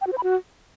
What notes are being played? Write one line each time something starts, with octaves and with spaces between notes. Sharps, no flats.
G5
F#4
C5
B5
F#4